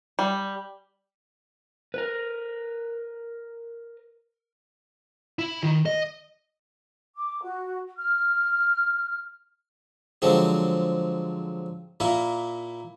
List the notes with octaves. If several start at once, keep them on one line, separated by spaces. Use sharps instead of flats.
G3
A#4 B4
E4
D#3
D#5
D6
F#4
F6
D3 F3 F#3 G#3 C4
A#2 A#3 E4 A#4